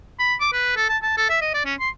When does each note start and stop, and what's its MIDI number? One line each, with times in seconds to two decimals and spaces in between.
0.19 0.35 83
0.40 0.52 86
0.53 0.74 71
0.76 0.85 69
0.89 0.97 81
1.03 1.17 81
1.17 1.27 69
1.29 1.37 76
1.42 1.52 75
1.54 1.64 74
1.65 1.74 61
1.80 1.89 84